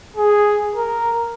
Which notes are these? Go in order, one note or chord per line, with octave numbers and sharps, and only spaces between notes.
G#4
A#4